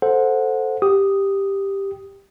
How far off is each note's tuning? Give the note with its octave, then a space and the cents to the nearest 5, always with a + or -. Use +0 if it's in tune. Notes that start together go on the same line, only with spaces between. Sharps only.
A4 +0 C5 +0 F#5 -20
G4 +5 D#6 +0